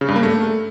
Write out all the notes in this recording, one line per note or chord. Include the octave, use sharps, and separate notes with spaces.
C#3
G2
A#3
A3